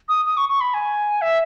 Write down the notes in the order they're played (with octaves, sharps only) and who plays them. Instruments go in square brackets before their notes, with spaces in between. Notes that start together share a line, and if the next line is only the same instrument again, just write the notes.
[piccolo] D#6
D#6
C#6
C#6
B5
G#5
E5